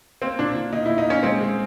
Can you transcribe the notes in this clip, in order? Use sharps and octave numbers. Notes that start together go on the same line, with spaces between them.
A#3 C4
A#2 D4
A#2
A#2 D#4
A#2 E4
D#4
A#3 C#4
G#3 C4
G#3